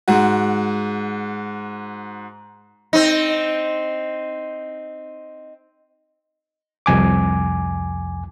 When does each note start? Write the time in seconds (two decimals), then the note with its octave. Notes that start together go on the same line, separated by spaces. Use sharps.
0.08 G#2 F#4
2.93 C4 D#4
6.86 C2 F2 G#5 D6